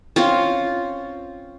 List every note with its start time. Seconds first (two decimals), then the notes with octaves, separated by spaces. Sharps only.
0.16 C4 C#4 F4